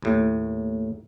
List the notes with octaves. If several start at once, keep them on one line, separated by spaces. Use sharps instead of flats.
D#2 A2